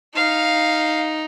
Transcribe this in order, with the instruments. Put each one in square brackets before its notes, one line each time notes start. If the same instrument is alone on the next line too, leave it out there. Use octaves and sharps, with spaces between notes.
[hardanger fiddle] D#4 [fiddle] F5